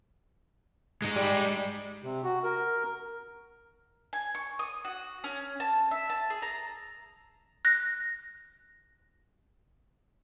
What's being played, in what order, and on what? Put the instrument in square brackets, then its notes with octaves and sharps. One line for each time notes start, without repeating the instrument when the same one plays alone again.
[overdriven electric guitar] G#3 D#4
[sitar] G3
[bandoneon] C3
F#4
A#4
[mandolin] G#5
C#6
D#6
F#4
C#4
A5
E5
A5
G#4
A#5
[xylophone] F#6 A#6